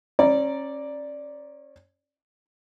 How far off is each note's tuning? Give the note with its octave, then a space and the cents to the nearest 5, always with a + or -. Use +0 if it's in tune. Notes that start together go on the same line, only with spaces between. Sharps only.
C#4 -30 D5 +0 A#5 +0